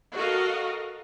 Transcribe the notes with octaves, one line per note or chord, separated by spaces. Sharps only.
F#4 A4 A#4 D#5 F5